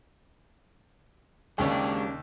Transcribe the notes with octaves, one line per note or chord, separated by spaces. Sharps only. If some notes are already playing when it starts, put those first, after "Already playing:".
D#2 C#3 G#3 A#3 C#4 D4 G4 C#5